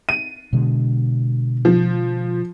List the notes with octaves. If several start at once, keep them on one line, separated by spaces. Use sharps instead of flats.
D#7
B2 D3 G#3
F3